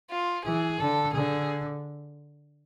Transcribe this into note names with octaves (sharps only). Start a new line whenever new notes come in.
F4
E3 G#4
D3 A4
D3 G#4